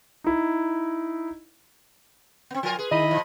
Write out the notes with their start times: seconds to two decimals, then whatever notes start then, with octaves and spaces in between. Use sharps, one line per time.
0.24 D#4 E4
2.51 B3 C4
2.63 F3 F4 A#4 G#5
2.79 G#4 B4
2.91 D#3 E4 D#5 B5
3.08 A#2 F3